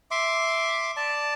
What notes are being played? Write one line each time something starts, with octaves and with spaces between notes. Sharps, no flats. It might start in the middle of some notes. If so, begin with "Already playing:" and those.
E5 C6 D6
D5 A5